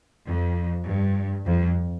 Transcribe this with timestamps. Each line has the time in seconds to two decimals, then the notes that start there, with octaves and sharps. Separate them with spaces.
0.27 F2
0.86 G2
1.46 F2